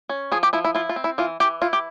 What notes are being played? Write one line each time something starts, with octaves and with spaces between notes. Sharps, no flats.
C#4
F3 G#4
G4
F3 E4
E4
E4 F4
F4
C4
E4
E3 F4
E3 G4
E4 F4
G4